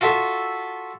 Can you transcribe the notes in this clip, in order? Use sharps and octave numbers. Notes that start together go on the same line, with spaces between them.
F4 F#4 A4 E5